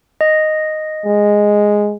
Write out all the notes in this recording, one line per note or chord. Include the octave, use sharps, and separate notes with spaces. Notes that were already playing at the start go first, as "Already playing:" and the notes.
D#5
G#3